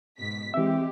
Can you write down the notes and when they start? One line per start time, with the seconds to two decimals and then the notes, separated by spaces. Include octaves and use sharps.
0.18 G#2 B2 B6
0.54 E3 G#3 C4 G4 E5